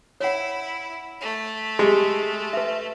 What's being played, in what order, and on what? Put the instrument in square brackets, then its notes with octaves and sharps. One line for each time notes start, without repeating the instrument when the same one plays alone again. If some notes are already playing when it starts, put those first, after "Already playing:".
[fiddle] E4 [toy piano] C#5 F#5
[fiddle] A3
[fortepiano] G#3 [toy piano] G4 G#4
[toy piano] B4 E5